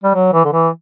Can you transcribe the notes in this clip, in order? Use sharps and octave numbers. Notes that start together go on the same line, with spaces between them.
G3
F#3
E3
D3
E3